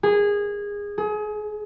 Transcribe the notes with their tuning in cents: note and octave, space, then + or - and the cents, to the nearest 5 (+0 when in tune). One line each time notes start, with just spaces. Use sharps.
G#4 -20
G#4 +30